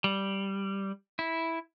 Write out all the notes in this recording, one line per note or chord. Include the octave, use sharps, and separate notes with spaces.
G3
E4